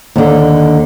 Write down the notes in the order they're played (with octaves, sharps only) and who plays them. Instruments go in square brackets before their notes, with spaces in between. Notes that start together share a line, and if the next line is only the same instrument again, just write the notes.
[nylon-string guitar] D#2 D3